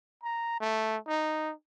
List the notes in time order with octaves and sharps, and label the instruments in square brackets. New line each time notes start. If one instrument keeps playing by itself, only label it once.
[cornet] A#5
A3
D#4